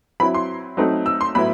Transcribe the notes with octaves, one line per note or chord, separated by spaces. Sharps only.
F#3 C4 E4 B5
C6
F#3 A3 C4 D#4
E6
C6
A2 F#3 B3 E4 B5